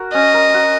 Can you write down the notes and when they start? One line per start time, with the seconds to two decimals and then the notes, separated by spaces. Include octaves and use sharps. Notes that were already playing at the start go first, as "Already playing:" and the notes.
Already playing: F#4 A#4
0.13 C#4 D#5
0.34 A#4
0.54 F#4